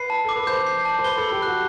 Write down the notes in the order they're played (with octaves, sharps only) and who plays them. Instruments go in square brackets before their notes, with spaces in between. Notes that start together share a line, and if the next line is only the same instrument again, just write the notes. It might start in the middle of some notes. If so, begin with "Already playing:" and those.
Already playing: [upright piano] B4 [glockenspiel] C7
[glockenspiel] A5
[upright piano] A4 [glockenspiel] D6
[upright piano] B4
[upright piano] C5 [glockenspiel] G6
[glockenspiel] C7
A5
[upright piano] C5
[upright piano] B4 [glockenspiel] G7
[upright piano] A4
[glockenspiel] B5
[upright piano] G4
[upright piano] F#4 [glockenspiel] F#6